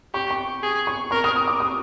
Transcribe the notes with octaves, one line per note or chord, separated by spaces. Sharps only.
G4 C#6
C#6
G#4
C#6
A#4 C#6
D#6
D#6
D6
D#6